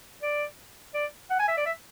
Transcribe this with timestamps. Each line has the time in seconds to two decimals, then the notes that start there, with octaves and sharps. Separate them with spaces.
0.22 D5
0.94 D5
1.30 F#5
1.40 G#5
1.48 E5
1.57 D5
1.66 E5